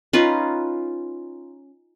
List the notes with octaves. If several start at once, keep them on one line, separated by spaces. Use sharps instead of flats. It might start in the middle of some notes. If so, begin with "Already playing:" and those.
C#4 D#4 F4 B4